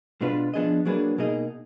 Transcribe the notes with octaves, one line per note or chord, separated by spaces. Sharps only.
B2 G#3 D4 F4 B4
F3 B3 D4 G#4 D#5
F#3 A#3 D4 G#4 B4
B2 A#3 D#4 G#4 D#5